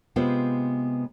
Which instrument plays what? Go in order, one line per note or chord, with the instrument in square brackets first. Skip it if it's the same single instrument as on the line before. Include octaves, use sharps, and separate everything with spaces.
[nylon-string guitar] C3 G#3 B3 F4 B4 C5